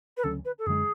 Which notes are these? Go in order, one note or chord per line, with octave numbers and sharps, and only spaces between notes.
B4
D2 C#3 F#3 C#4 A4
B4
A4
F#2 D3 G#3 G#4